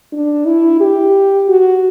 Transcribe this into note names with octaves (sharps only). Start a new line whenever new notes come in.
D4
E4
G4
F#4